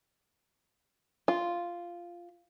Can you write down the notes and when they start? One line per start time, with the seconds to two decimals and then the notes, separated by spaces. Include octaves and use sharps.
1.28 F4